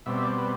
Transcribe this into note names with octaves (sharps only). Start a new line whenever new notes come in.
B2 G3 C4 E5
E5
D5
B4